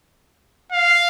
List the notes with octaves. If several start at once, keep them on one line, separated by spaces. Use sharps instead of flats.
F5